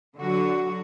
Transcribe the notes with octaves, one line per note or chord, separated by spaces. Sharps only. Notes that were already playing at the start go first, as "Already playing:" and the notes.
D3 F#3 F#4